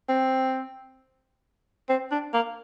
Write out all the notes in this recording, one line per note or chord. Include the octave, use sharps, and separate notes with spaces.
C4
C4
D4
A#3